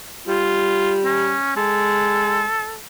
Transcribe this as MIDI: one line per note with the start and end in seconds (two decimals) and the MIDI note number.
0.28 1.35 55
0.28 0.99 65
1.05 1.54 61
1.57 2.43 56
1.57 2.77 69